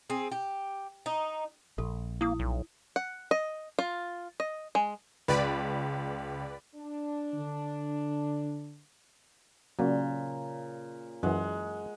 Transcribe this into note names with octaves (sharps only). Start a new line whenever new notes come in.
C4 G#4
G4
D#4
A#1 A4
A#3 E4 D#6
B1
F#5
D#5
F4
D#5
G#3
C#2 B4 D5 B5
D4
D3
A#2 C#3 F#3 A#3 F#4
F#2 E3 G#3 F#5